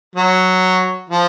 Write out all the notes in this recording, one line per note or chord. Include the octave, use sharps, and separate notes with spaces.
F#3
F3